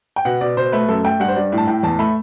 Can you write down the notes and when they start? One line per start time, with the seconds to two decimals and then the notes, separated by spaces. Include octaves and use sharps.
0.16 G5
0.25 B2 F#5
0.41 B2 D5
0.57 B2 C5
0.72 A3 B4
0.88 F#2 A4
1.05 A3 G5
1.20 G2 F#5
1.28 C5
1.36 G2 D5
1.52 A2
1.58 A5
1.68 A2 G5
1.83 E2 A5
1.99 A3 B5